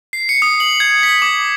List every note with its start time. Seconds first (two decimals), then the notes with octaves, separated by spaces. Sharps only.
0.13 C7
0.29 C#7
0.42 D#6
0.60 F#7
0.80 G#6
1.03 B6
1.22 D6